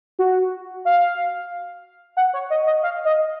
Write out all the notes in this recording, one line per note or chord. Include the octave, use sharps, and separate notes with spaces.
F#4
F5
F#5
C#5
D#5
D#5
F5
D#5